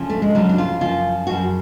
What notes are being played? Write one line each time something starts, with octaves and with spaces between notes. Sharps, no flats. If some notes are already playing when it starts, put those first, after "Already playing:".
Already playing: D2 C#3 F3
A3
G#3
D2 C#3 F3 F#3
D4
F4
F#2 C#3 F3 F4
F#2 C#3 F3 F#4